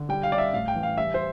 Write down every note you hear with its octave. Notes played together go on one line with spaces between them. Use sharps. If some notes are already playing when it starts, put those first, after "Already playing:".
Already playing: D3
G3 G5
F5
G3 D5
E5
A2 F5
G5
E3
F5
G3 E5
C5